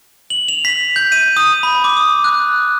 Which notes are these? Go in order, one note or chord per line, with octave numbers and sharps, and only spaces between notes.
F#7
F7
B6
G6
D#7
D#6
B5
D6
D#6
F#6